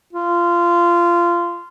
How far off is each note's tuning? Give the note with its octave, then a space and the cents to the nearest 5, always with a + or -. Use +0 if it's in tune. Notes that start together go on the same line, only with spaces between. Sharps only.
F4 -20